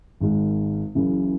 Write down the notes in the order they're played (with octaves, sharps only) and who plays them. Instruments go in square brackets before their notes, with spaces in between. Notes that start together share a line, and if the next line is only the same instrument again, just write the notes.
[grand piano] G#1 G#2 D#3 G#3
F#1 F#2 C#3 E3